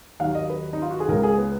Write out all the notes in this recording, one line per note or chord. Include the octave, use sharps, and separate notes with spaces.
D#2 D#3 F#3 F5
D#5
B4
D#4
F4
F#4
G#4
C#2 C#3 G#3 A#4
G#4
B3